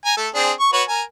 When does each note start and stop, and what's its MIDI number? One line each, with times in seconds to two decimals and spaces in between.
0.05 0.15 80
0.05 0.15 82
0.17 0.29 57
0.17 0.29 69
0.35 0.52 60
0.35 0.52 62
0.35 0.52 68
0.60 0.71 85
0.73 0.83 66
0.73 0.83 71
0.73 0.83 73
0.88 1.02 70
0.88 1.02 80